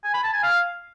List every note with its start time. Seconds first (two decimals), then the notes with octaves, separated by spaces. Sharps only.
0.04 G#5
0.14 B5
0.24 A5
0.34 G#5
0.43 F5